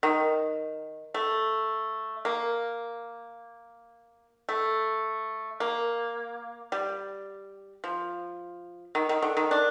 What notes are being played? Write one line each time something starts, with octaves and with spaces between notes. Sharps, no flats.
D#3
A3
A#3
A3
A#3
G3
F3
D#3
D#3
D3
D#3
D4